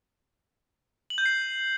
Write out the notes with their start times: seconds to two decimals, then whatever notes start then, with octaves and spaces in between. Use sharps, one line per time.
1.10 F#7
1.18 G6
1.26 C7